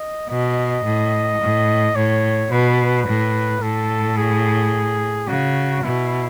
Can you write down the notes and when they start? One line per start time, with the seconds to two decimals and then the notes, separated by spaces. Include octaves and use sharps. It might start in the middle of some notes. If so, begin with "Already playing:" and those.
Already playing: D#5
0.29 B2 D#5
0.85 A2
1.41 A2
1.95 A2 C#5
2.51 B2 B4
3.07 A2
3.62 A2 A4
4.17 G#4
5.28 C#3 F#4
5.83 B2 E4